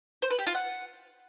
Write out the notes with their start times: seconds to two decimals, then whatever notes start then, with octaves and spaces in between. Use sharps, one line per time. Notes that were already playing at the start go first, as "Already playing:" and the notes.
0.22 C5
0.30 B4
0.38 G4
0.47 F4
0.55 F#5